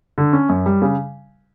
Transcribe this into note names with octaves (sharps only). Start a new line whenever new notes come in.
D3
C#4
F#2
G3
C#3